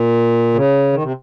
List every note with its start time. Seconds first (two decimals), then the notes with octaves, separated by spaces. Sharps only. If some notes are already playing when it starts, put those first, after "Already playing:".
Already playing: A#2
0.54 C#3
0.93 D#3
1.02 C3